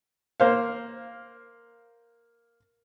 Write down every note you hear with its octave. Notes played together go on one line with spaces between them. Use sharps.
A#3 C5 F5